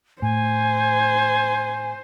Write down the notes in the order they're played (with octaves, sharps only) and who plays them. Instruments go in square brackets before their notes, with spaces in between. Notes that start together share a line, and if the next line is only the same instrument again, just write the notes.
[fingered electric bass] A2 [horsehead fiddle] C5 [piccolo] G#5